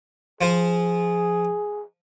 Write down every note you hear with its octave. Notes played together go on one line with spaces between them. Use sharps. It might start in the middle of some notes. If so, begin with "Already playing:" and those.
F3 F4 G#4 C5